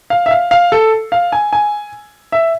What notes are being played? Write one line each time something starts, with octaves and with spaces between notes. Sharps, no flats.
F5
E5
F5
F5
A4
F5
G#5
G#5
E5